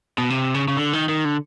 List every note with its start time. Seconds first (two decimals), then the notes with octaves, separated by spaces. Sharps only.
0.18 B2
0.30 C3
0.54 C#3
0.68 C#3
0.77 D3
0.93 D#3
1.09 D#3
1.25 D3